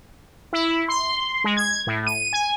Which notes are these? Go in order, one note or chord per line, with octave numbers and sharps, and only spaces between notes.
E4
C6
G#3
G#6
A2
D#7
G#5